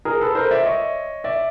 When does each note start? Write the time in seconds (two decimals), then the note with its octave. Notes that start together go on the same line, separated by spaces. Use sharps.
0.05 G#4 A#4
0.21 A4 B4
0.35 A#4 C5
0.51 D5 E5
0.65 C#5 D#5
1.24 D5 E5